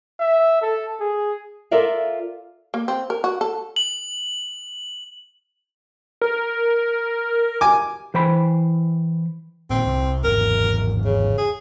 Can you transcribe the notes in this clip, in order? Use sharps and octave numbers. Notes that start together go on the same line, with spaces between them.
E5
A4
G#4
F4 A4 A#4 D5 E5 F5
A#3
C4
A#4
F#4
A4
F#7
A#4
G#5 D6
E3 C5 G5 B5
G1 A#2 D#3 C4
C2
G#1 E2 A#4
C#3
G#4